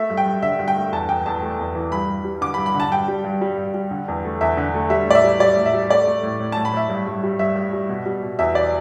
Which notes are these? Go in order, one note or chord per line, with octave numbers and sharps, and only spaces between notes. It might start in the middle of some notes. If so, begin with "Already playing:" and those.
Already playing: A3 E5
G2
G5
G2
D3 E5
G2
G5
A3
E2 A5
E2 G5
E2 A5
A3
E2
E3
G2 B5
G2
G3
D3 D6
B5
G2
B5
D3
A5
G2 G5
G3
G2
G3
G2
G3
D3
E2
A3
E2 E5
D3
A3
G3 E5
A2 D5
E5
G3
G3 D5
A2
E5
G3
A3 D5
A3
A2
A2
A2 A5
B5
A2 E5
G2
G2
G3
G2 E5
G2
G3
B2
G3
B2
E2 E5
D5